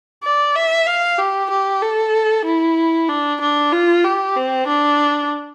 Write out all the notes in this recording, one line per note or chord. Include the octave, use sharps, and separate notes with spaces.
D5
E5
F5
G4
G4
A4
E4
D4
D4
F4
G4
C4
D4